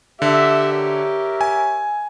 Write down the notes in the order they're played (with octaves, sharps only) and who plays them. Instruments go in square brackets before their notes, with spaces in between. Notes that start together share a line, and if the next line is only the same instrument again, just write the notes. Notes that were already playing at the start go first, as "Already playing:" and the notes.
[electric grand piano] D3 [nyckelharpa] G4 [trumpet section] E5
[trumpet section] A#4 C#5 E5
[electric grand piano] G#5